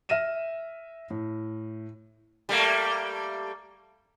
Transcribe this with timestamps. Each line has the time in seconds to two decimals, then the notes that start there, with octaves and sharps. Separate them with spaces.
0.09 E5 F6 A#6 D#7 E7
1.10 A2
2.49 G3 A3 A#3